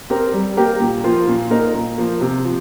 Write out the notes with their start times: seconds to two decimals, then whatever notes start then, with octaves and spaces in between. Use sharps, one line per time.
0.10 C4 G4 A#4
0.33 G3
0.57 A#3 G4 A#4
0.80 A#2
1.04 F3 A#3 F4
1.28 A#2
1.50 A#3 D#4 A#4
1.74 A#2
1.98 F3 A#3
2.21 C3
2.45 F3